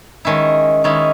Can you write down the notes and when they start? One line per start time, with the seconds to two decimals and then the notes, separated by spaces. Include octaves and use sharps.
0.25 D#3 G#3 C#4 E4
0.84 D#3 G#3 C#4 E4